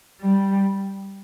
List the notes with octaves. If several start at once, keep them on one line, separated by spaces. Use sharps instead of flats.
G3